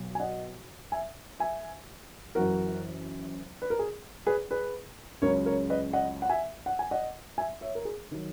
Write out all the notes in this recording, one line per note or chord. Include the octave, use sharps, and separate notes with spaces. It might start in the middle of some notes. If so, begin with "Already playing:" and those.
Already playing: B1 B2 F#3
G#5
D#5 F#5
E5 G#5
E5 G#5
F#1 F#2 E3 F#4 A#4
B4
A#4
G#4
G#4 B4
G#4 B4
C#2 C#3 F#3 A#4 C#5
A#4 C#5
B4 D#5
D#5 F#5
F#5
E5 G#5
F#5
G#5
D#5 F#5
E5 G#5
C#5 E5
A#4
G#4
D#3 F#3